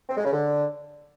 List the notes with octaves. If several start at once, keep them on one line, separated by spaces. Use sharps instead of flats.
C4
G#3
C#3
D3